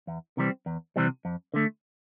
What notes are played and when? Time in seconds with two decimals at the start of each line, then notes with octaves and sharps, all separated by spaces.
0.07 E2
0.37 C3 E3 G3 C4
0.66 E2
0.96 C3 E3 G3 C4
1.25 F2
1.54 D3 A3